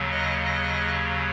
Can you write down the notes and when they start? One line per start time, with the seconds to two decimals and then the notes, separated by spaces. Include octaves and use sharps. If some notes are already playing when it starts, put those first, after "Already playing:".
Already playing: D#2 C#3 F#3
0.12 D#5
0.45 D#5